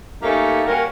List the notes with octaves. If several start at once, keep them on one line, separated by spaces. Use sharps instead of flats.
A3 A#3 C#4 D#4 G4 A4
G3 A#3 C#4 F#4 A#4